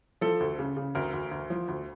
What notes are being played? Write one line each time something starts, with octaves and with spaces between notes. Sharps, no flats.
F3 A4
D2
C#3
C#3
D2 A#4
D2
D2
F3
D2